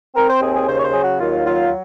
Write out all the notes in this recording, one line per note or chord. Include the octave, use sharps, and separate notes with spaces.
C4 A#4
C5
D#2 G#4
G#4
C#3 C5
C#5
C5
F#3 G#4
F#4
D#2 F4
F#3 F4